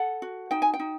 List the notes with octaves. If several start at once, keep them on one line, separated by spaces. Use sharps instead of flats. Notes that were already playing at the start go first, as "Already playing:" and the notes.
Already playing: A4 F#5
F#4
D#4 G5
G#5
G5
D#4